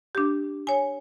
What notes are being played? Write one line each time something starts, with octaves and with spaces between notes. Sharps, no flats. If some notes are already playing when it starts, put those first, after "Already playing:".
D4 G4
C#5 G#5